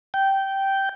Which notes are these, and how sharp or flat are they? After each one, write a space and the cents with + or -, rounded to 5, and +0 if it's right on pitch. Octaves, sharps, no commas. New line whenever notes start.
G5 -10